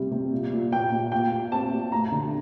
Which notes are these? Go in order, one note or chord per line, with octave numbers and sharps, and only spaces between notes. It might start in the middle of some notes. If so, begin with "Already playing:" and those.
Already playing: C3 G3
C3
A#2
A#2
A#2 G5
A#2
A#2 G5
A#2
C4 A5
A#2
A3 A#5
D3